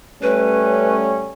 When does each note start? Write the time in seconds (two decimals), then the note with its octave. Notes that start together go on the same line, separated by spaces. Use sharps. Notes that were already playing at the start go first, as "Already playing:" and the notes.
0.22 G3 A3 C#4 B4